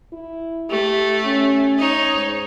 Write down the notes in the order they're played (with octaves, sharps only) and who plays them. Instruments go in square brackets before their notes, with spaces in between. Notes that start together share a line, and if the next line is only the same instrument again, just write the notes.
[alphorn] E4
[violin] A3 [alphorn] G4
[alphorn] C#4
[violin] D#4 C#5
[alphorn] G#2